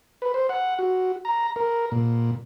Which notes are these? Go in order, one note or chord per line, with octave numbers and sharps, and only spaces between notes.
B4
C5
F#5
F#4
A#5
A#4
A#2